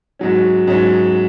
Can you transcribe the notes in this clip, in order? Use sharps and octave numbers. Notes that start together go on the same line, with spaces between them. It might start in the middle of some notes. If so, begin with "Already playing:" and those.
G#2 F#3 C#4
G#2 F#3 C#4